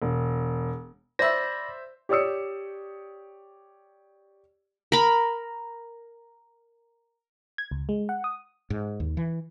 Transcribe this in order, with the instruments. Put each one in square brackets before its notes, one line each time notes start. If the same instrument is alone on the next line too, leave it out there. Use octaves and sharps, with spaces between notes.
[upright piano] E1
[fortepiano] C5 E5 [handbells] D5 B5 [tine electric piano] A#6
[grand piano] G4 C#5 D5 D#6 E6 C#7
[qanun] A#4 B5
[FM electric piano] G#6
C#2
G#3
F#5
D#6
[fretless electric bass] G#2
D#2
E3